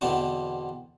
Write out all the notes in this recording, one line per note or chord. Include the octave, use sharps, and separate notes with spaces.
E2 B2 D3 B3 C4 D4